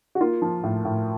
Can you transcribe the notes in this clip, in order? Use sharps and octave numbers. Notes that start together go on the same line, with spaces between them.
F#4
A#3 F4
F3
A2
A2